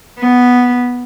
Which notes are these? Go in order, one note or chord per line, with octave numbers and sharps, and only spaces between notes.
B3